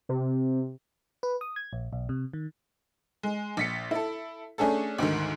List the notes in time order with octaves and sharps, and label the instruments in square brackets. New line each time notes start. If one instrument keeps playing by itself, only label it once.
[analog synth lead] C3
[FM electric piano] B4
D#6
G#6
A#1
B1
C3
D#3
[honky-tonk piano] G#3
A#1 B6 C#7
E4 A4
A3 C#4 D4 G#4 A4
D2 G#2 D3 D#3